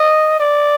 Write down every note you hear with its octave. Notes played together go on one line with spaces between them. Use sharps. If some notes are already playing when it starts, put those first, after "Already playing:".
Already playing: D#5
D5